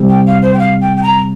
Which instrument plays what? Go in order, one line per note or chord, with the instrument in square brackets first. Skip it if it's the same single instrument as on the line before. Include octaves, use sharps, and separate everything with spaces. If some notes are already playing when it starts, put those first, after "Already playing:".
Already playing: [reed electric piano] C3 G3 C4
[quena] G5
F5
C5
G5
F5
G5
G5
A#5